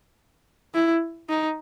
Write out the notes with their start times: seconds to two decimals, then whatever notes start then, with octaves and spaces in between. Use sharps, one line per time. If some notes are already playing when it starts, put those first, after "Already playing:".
0.74 E4
1.29 D#4